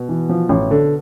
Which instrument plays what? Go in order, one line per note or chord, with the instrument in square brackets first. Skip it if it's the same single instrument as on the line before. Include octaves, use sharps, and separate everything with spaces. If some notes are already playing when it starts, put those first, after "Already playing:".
Already playing: [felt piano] B2
[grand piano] E3
F3
A1
D3